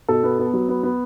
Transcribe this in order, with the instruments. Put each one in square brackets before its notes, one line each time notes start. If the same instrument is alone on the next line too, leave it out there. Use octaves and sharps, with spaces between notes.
[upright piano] B2 A4
B3
B3
F#3
B3
B3